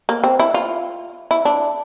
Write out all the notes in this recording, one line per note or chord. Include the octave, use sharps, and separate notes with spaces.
A#3
C4
E4
F4
E4
D4